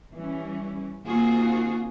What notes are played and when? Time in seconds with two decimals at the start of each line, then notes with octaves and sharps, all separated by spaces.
0.15 E3 G3 C#4
1.06 D#3 A#3 C4 F4 F#4 G#4